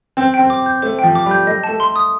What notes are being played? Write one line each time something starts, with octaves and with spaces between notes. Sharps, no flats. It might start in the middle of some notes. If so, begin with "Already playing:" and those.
C4 C5
G5
C4
D6
G6
A3 C5
F3 G5
D6
G3
G6
A3 D#5
A5
A3
C6
D#6